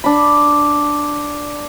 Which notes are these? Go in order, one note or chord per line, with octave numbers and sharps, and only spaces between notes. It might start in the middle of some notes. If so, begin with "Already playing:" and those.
D4 B5